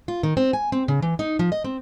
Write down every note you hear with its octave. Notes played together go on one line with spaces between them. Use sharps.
F4
D#3
C4
G#5
C4
C#3
E3
D#4
F3
D#5
C4